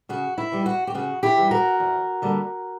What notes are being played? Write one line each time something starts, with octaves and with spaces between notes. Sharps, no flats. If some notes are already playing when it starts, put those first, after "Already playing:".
C#3 F#4
E4
E3 G3
F#4
G4
C#3 F#4
E4 G4
E3 G3
F#4 A#4
E2
D3 G3 A#3